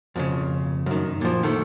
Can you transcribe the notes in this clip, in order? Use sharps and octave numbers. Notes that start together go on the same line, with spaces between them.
F2 A#2 C#3
F#2 D#3
A#2 F3
D#3 A3